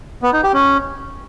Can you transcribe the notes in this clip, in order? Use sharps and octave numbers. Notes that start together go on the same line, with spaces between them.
B3
D#4
G4
C#4